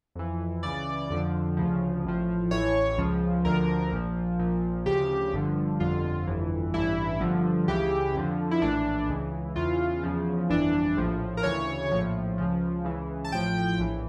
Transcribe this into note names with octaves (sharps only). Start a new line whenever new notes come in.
F2 E3
C#2 C#3 E3 D5
F2 D3 F3
D2 C#3 F3
A1 A2 F3
A1 A2 E3 C#5
C#2 C#3 F3
D2 D3 F3 A#4
A#1 A#2 F3
A#1 A#2 F3
D2 C#3 F3 G4
G1 G2 D3 F3
G1 F2 D3 F4
G1 F2 E3
A1 G2 E3 E4
G1 G2 D3 F3
C#2 C#3 E3 G4
F2 D3 F3
E4
A#1 A2 E3 D4
C#2 C#3 E3
E2 C#3 E3 F4
E2 C#3 F3
G1 F2 E3 D4
A#1 A2 F3
A#4
D2 C#3 E3 C#5
A#1 A2 F3
C#2 C#3 F3
C#2 C#3 E3
A5
A1 A2 F3 G5
A#1 A2 E3